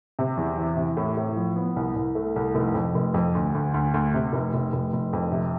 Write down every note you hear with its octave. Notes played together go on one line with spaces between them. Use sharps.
C3
E2
E3
C3
A2
A2
F3
B3
C2
C2
A3
C2
F1
F2
F1
F2
D2
D2
D2
D2
C3
F1
F1
F1
F1
F2
C3